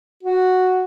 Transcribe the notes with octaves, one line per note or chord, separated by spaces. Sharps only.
F#4